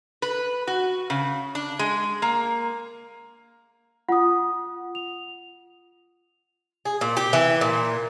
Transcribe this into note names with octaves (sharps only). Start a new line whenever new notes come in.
B4
F#4
C#3
D4
G#3
A#3
F4 F#5 D#6
F7
G#4
A#2
G4
E3
A#2